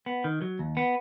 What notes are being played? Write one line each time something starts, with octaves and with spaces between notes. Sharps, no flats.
B3
D#3
F#3
D#2
B3